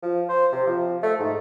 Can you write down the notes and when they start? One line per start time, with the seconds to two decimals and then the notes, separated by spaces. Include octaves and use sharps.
0.03 F3
0.29 C5
0.53 C3
0.67 F3
1.03 A3
1.20 G#2